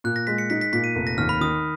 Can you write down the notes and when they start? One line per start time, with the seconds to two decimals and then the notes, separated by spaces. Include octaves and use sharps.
0.04 A#2 F#6
0.16 A#6
0.27 G#3 B6
0.38 C#7
0.50 D#4 B6
0.61 B6
0.73 A#2 B6
0.84 D#7
0.95 F1
1.07 A#6
1.18 D#2 F6
1.29 B5
1.41 D#3 D#6